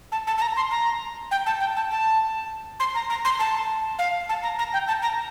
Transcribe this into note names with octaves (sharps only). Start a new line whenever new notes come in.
A5
A5
A5
A#5
C6
A#5
G5
A5
G5
A5
A5
C6
A#5
A#5
C6
A5
F5
A5
A#5
A#5
G5
A5
A#5